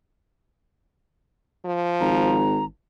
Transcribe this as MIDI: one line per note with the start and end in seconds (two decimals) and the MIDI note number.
1.65 2.46 53
2.01 2.65 32
2.01 2.65 82